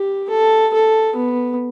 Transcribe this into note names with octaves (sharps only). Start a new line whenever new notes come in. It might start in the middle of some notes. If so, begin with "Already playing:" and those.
Already playing: G4
A4
A4
B3